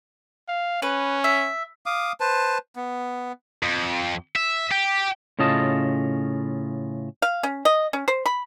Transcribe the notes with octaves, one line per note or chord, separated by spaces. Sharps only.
F5
C#4 B4
E5
F5 D6 D#6
B4 C5 A5
B3
F2
E5
G4
A2 C#3 C#4 F4 D#5 A5
F5
C#4
D#5
C#4
C5
B5